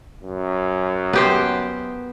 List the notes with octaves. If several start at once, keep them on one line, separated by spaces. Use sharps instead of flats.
F#2
B3 G4 C5